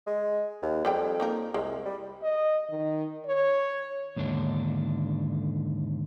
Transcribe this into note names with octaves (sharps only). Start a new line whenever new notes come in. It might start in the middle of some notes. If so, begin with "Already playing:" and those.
G#3
D#2
F2 G3 G#3 G5
A#3 D#4 A#4
C2 G#3
G3
D#5
D#3
C#5
D#2 G#2 D3 D4